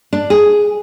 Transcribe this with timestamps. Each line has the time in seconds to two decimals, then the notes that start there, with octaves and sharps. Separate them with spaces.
0.13 D4
0.30 G#4